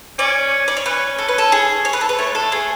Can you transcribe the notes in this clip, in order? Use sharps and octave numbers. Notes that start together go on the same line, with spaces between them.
C#4 D5
D5
C#5
C#4 B4
A4
B4
A4
G#4
C#5
B4
A4
B4
A3 C#5
G#3 A4
A3
G#4